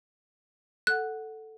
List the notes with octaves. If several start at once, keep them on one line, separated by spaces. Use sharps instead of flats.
A4 F#5 F#6